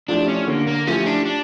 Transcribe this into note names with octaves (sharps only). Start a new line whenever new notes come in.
F3 A3 D4 E4 G4
C#4
D3 A#3
A#3
F3 A3 C#4 E4 G4
D4
D4